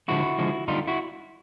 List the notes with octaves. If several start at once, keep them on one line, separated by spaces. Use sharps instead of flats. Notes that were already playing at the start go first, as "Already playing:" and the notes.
D3 F3 G#3 E4 F#4
D3 F3 G#3
D3 G3 D#4 F4
E4 F#4